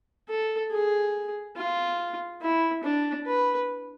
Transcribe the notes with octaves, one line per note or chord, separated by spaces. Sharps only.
A4
G#4
F4
E4
D4
B4